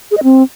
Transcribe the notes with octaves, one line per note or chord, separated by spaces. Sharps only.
G#4
D#5
C4